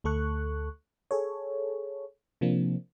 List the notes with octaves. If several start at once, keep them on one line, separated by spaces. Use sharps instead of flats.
D2 A3 A4 C#6 F#6
G#4 A4 C#5
C3 F3 A#3 C4 D4